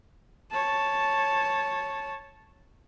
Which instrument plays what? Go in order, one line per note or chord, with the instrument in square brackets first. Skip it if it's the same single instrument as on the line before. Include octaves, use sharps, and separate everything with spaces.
[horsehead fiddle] C#5 A5